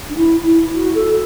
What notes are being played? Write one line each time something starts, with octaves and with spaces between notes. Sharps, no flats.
D4
E4
E4
F#4
A4